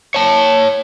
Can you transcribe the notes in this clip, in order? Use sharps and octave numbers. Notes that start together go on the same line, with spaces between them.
C#5 A5